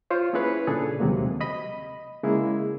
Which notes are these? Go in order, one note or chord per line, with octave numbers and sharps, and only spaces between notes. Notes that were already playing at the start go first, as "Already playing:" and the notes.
F4 C5 C#5
A#3 C#4 E4 G#4 B4 C#5
A#2 C#3 D4 G#4 A4
D#2 C3 D#3 F#3 G#3 A#3
D#5 B5
C#3 G#3 A#3 E4 G#4